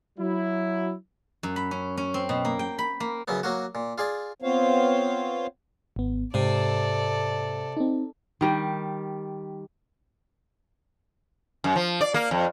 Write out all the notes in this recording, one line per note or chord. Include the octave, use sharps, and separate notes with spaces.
F#3 E4
F#2
B5
C#4
C#4
C4
B2
A#3
G5
B5
A#3
F#2 C#3 F#3 B3
F#3 A#3 F#4
A#2
F4 G#4 D5
B3 C4 F4 C5 C#5 F5
G#1 B3
G#2 C3 A4 D5
C4 D#4
D#3 G3 G4
F#2
F3
D5
A#3
F2